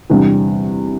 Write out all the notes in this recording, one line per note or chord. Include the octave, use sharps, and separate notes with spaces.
E2 C3 G3 D4